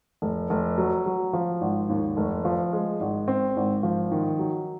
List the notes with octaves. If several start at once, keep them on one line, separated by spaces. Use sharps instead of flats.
F1
F1
F#3
F#3
F3
G#1
D#2
F1
F3
G#3
G#1
C4
G#1
F3
D#3
F#3